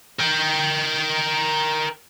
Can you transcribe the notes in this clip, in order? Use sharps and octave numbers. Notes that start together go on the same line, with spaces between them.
A#4 G5